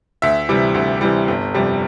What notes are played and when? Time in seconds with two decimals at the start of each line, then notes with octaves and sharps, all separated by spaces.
0.22 D2 E5
0.49 C3 E3 G3
0.74 D2
1.01 C3 E3 G3
1.28 G1
1.54 F2 C3 G3